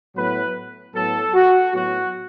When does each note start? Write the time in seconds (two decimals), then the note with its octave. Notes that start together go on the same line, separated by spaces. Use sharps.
0.16 A2 F#3 B3 B4
0.95 A2 F#3 B3 A4
1.34 F#4
1.74 A2 F#3 B3 F#4